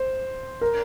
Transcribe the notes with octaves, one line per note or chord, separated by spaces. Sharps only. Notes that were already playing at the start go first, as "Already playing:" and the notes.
Already playing: C5
A#4